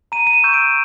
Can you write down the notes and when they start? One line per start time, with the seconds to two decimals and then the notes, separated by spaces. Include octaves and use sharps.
0.12 A#5 D#7
0.27 D#7
0.33 E7
0.44 C#6 E6 G6
0.54 D7